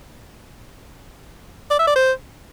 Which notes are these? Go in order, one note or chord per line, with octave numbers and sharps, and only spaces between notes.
D5
E5
D5
C5